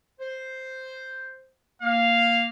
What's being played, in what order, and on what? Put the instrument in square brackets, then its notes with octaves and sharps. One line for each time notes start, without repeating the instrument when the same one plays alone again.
[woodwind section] C5
[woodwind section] A#3 [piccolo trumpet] F5